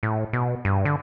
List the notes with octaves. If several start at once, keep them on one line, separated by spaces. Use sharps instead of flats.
A2
B2
G2
D3